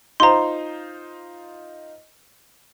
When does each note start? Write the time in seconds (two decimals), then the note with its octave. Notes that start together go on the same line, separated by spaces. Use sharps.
0.20 D#4 F4 C5 A#5 C6